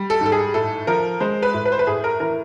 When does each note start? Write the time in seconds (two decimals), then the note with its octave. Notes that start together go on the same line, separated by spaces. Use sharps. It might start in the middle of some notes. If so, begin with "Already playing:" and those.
Already playing: G3
0.10 A4
0.21 G#2 A4
0.32 G#4
0.54 A2 A4
0.87 F3 A#4
1.20 G#3 C5
1.42 B4
1.54 A2
1.65 B4
1.72 C5
1.79 B4
1.87 A2 G#4
2.04 A#4
2.20 E3 A#4